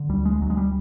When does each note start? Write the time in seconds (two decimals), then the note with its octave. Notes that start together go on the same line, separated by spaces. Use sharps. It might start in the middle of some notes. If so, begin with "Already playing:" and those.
Already playing: D3
0.09 D2 G3
0.25 G#3
0.41 D2 F#3
0.50 G#3
0.57 G3